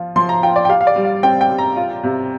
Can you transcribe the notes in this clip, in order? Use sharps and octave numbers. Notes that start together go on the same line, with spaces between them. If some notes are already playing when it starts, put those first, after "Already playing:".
Already playing: F3 F4
F3 C6
A#5
F4 G5
D5
G5
G4 F5
F5
D5
G3
F5
C4 G5
G5
G3
A#5
F4
C3